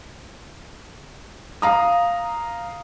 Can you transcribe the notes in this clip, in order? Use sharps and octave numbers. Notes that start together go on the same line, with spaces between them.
F5 A#5 D#6